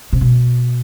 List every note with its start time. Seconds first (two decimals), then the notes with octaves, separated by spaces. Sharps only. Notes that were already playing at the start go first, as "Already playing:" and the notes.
0.13 C3
0.21 B2